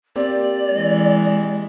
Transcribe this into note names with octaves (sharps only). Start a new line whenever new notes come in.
A#3 C4 G4 D5
E3 G#3